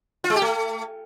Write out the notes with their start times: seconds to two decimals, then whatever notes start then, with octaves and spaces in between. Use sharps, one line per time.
0.24 F4
0.30 G#3
0.36 G4
0.42 A3